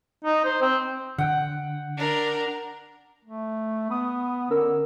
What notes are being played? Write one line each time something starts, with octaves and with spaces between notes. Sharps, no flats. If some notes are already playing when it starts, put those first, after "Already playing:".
D#4
C5
C4
D3 F#5 G5
D4 A#4
A3
B3 B5 D#6
D3 C#4 A#4 E6